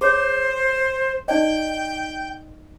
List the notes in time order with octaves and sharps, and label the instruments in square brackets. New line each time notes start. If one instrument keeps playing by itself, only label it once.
[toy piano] G#4 C#5 [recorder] C5
[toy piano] D#4 D5 D#5 [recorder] G5